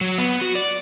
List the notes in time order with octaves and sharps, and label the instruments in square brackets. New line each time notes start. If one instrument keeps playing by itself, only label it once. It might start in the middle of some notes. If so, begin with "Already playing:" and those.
[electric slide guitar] F#3
B3
F#4
D5